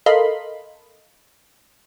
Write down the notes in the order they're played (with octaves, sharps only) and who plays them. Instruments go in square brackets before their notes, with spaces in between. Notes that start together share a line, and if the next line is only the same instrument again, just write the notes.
[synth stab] A4 A#4 D#5 F5 B5 C6